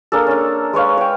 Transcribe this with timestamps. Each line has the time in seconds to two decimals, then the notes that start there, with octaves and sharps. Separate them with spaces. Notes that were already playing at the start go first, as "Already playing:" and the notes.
0.12 A#3 D4 G#4 A4
0.27 C#4 D4
0.73 G#3 B4 C#5 F5
0.97 C#5 G5